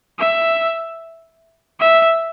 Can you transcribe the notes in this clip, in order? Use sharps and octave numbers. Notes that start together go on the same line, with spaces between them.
E5
E5